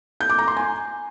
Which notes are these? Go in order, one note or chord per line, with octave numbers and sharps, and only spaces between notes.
G6
D6
A#5
C6
G#5